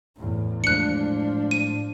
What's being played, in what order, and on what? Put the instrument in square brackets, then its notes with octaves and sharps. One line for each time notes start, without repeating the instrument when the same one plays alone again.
[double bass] E2 A2
[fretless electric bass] A2 G#3 [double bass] F3 D4 [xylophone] F#6 C#7
[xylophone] D#7